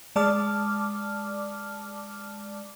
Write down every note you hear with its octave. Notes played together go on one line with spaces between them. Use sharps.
G#3 D5 A5 D6 F6